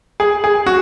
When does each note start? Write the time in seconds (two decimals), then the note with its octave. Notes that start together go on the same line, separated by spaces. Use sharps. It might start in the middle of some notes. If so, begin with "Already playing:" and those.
0.20 G#4
0.44 G#4
0.66 F#4